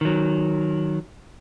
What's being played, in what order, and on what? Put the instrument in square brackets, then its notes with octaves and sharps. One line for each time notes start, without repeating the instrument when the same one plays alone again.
[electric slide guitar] D#3 F#3